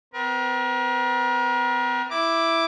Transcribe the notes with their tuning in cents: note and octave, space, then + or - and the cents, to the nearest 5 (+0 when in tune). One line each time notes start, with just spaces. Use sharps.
C4 -45 A#4 +40
E4 +0 D6 +0